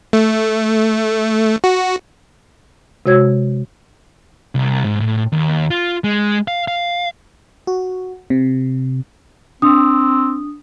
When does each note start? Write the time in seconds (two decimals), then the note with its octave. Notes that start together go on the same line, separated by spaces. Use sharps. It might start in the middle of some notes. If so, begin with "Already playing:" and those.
0.13 A3
1.64 F#4
3.06 C3 G#3 F#4 C#5 E6 G#6
4.55 C2
4.85 G#2
5.00 A2
5.32 D#2
5.71 F4
6.04 G#3
6.48 F5
6.68 F5
7.67 F#4
8.30 C3
9.62 C4 D4 D#6